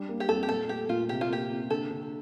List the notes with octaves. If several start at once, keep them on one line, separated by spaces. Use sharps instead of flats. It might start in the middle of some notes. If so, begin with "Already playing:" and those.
Already playing: G3 D4
A#3
G4
F2 A4
G4
A#2 A4
A3 G4
A#2 F4
C3 G4
F4
A#3 G4
C3
D3 A4
D3